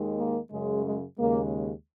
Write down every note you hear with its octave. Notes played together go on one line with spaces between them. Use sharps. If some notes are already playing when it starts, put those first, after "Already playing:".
Already playing: D#2 D#3 G#3
A#3
F#2 C#3 G#3
G#3
D#2 C#3 G#3 A#3